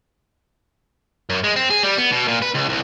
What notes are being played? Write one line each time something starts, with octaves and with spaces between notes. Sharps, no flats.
F#2
G#3
C4
G#4
G3
B3
B2
A#2
B4
C#2
C2